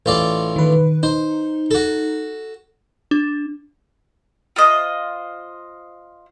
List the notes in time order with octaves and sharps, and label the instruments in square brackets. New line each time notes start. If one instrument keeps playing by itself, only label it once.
[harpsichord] A1 F4 D5
[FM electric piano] D#3 B4
[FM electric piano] D#4 [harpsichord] C5
[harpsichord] F#4 A4
[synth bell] D4
[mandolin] F4 C5 D#5